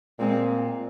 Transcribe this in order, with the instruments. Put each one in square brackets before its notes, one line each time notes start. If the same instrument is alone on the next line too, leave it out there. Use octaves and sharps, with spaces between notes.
[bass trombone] A#2 [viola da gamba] G#3 C4